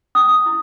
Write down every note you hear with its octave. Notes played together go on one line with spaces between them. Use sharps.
C#4 D#6
E4